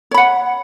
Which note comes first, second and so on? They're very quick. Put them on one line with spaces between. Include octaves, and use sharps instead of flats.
C#5 B5 F#5